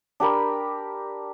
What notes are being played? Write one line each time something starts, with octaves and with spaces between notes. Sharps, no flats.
D4 G4 A#4 B5